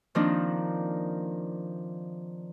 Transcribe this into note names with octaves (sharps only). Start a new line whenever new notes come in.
D#3 F3 A#3 C4 D4 D#4